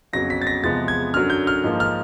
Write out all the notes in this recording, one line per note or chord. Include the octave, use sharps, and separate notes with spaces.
F2 C#3 F#3 B3 A#6
B6
A6
A#6
E2 C3 F3 G#3 B3 A6
G#6
F#2 D3 F#3 F6
G6
F6
G#2 F3 A#3
F6